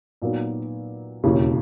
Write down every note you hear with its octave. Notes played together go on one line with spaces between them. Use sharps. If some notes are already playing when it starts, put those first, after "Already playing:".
A#2 F#3 B3 D#4
E1 D#2 C#3 E3